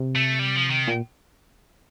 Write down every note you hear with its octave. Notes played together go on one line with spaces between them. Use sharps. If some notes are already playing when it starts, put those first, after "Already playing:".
Already playing: C3
A3
G3
F3
D#3
A#2